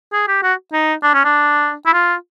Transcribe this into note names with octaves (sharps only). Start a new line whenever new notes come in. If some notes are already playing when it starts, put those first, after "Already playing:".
G#4
G4
F#4
D#4
D4
C#4
D4
E4
F4